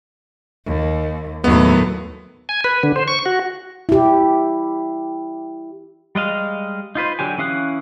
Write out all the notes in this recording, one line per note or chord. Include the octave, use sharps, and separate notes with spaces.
D#2
D#2 A2 F#3 B3
G#5
B4
D3
C5
C#6
F#4
E4 G4
G3 G#3 D#5 F5
D#4 F4 B4 C5
D3 F#3 G4 G#5
E3 C#4 F5 D#6 F#6